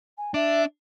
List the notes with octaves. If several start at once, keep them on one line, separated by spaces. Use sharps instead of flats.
G#5
D4 E5